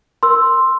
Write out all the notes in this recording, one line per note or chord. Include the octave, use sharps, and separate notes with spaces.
A#4 C6 E6